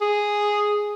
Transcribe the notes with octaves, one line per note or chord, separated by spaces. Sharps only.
G#4